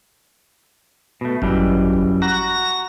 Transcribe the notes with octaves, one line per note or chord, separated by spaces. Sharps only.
B2 A3
G#1 F#2 E3 G3
F#4 A#5